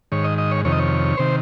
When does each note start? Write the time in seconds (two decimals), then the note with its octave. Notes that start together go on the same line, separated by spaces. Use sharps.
0.12 G#2 D#3 C#5
0.24 D#5
0.38 D#5
0.51 C#5
0.65 F2 C3 D#3 C#5
0.72 D#5
0.79 C#5
1.17 C3 D#3 C5